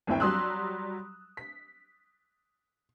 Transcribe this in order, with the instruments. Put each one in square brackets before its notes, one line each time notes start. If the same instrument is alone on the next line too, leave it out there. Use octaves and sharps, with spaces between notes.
[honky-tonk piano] G1 D#2 C4 E4 G5
F#3 G3 C6 D#6 E6 F#6
B6